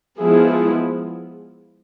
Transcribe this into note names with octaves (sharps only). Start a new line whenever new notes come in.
F3 G#3 B3 E4 G#4